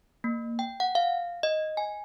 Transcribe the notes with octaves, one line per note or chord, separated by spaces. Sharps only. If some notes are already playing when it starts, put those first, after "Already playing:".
A#3
G5
F#5
F5
D#5
G#5